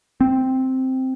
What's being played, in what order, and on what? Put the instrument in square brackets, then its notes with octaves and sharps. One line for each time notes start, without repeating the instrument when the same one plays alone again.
[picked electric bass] C4